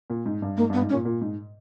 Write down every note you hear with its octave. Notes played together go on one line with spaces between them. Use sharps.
A#2
G#2
G2
G#2 A#3
G2
B3
G#2
C#4
A#2
A#2
G#2